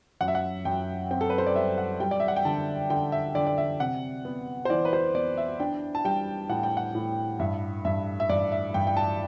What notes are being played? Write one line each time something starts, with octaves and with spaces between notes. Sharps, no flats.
F#2 F#5
E5
F#5
F#2 G5
C4 G5
A4
B4
C5
D5
G3 E5
F#5
G3 G5
D5
E5
F#5
G5
D3 A5
D3 G5
E5
D3 D5
D5
E5
C3 F#5
B3
C5
E3 D5
B4
C5
B3 D5
E5
D4 G5
A5
G3 G5
A2 F#5
G5
F#5
A2
G2 E5
G2 E5
E5
G2 D5
E5
G2 G5
G5
A5